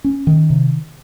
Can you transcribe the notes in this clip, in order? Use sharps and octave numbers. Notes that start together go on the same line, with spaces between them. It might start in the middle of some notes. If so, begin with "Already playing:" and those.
C#4
D#3
C3